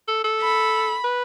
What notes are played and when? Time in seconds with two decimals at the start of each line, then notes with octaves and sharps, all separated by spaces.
0.08 A4
0.24 A4
0.41 B5
1.04 B4